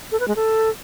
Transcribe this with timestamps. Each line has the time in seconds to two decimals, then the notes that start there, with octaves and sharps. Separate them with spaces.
0.12 A4
0.20 B4
0.28 G#3
0.36 A4